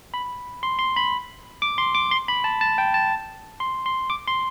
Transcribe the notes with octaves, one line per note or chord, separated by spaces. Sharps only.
B5
C6
C6
B5
D6
C6
D6
C6
B5
A5
A5
G5
A5
C6
C6
D6
C6